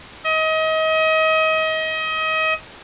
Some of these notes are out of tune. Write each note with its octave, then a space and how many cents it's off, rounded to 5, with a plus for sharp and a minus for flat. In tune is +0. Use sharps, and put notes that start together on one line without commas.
D#5 +30